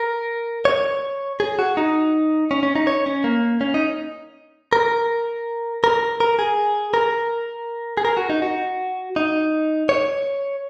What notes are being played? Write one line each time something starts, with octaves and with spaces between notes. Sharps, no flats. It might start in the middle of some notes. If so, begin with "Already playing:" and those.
Already playing: A#4
C#5
G#4
F#4
D#4
C#4
C#4
D#4
C#5
C#4
A#3
C#4
D#4
A#4
A#4
A#4
G#4
A#4
G#4
A#4
F#4
D#4
F#4
D#4
C#5